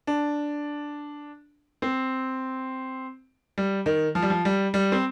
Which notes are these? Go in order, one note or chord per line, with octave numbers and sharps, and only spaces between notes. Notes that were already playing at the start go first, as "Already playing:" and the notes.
D4
C4
G3
D#3
F3
G3
F3
G3
G3
C4